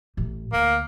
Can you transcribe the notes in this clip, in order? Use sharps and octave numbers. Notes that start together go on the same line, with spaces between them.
A1
D2 A#3